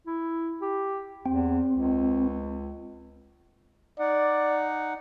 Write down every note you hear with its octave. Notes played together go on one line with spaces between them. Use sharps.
E4
G4
E2 C4
C#2
D#4 D5 F#5